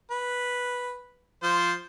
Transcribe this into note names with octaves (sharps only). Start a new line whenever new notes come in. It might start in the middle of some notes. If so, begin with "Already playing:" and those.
B4
F3 C5